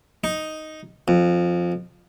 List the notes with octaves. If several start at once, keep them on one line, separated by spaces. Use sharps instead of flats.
D#4
F2